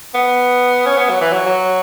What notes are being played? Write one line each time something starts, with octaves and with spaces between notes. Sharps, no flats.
B3
C#4
B3
F#3
E3
F#3
F#3